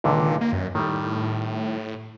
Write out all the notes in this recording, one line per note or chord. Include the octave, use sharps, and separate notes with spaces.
C#2 A#2 D3 D#3
A#3 D#5
F#2
A2 D#3 G3